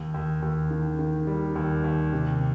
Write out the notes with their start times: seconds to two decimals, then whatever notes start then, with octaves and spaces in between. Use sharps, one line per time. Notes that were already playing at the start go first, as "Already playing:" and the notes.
Already playing: D#2
0.14 D#2
0.42 D#2
0.71 D#3
0.99 D#3
1.27 G3
1.55 D#2
1.84 D#2
2.13 C3